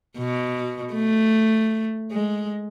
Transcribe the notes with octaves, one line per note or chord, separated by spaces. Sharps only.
B2
A3
G#3